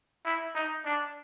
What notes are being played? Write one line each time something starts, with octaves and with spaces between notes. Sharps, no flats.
E4
D#4
D4